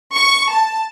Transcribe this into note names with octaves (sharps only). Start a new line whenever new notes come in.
C#6
A5